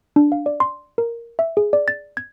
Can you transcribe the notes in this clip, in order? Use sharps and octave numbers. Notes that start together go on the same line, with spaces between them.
D4
F5
D5
C6
A#4
E5
G#4
D5
A6
G#6